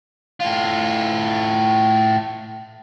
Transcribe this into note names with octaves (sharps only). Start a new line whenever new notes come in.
A2 F4